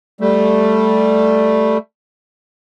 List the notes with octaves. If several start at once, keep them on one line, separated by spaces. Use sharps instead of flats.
G3 A3